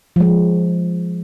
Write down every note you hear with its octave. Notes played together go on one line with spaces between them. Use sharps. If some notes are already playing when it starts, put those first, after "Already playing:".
F3 G#3